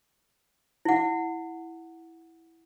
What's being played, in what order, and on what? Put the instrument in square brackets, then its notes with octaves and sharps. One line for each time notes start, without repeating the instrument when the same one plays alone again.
[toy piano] E4 F#5